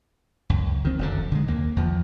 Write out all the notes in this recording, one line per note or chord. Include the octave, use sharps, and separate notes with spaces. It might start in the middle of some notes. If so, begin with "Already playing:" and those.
C#2 F#2
D#3 C4
F1 F#2 D3
D3 D#3 G#3
D#2 A#3
E2 F3